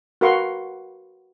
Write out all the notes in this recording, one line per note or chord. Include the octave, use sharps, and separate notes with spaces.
F#4 A#4 B4 F5 C6 C#6